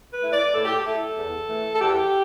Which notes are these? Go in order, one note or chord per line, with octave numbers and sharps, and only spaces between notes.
B4
A3 E4
D5
A2 A4
G4
A4
A3 E4
E2
E3 A3
A4
E2 G4